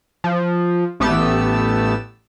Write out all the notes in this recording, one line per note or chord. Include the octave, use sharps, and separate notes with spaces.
F3
A1 A3 B3 G4 A5 E6